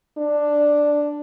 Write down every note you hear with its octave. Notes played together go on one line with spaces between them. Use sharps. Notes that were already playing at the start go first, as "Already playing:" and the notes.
D4